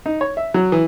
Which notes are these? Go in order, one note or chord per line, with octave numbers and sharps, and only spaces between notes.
D#4
C#5
E5
F#3
E3